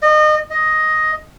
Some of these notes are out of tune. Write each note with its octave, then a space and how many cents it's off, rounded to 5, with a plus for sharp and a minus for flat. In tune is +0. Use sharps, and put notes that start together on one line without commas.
D#5 -30
D#5 +5